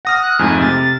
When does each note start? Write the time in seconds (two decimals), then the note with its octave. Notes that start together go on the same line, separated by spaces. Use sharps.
0.05 F#5 D#6 F6 A#6
0.21 F#6
0.39 F2 G#2 A3 G#5
0.60 C3 A6